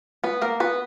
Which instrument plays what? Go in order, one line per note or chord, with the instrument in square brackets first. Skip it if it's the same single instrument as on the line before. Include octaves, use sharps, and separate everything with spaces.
[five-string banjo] B3 B4
A#3 A#4
B3 B4